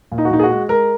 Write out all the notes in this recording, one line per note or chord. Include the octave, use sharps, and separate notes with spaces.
A#2
D#4
F#4
A#2 D#4
G#4
F#4
G#3
G#3 A#4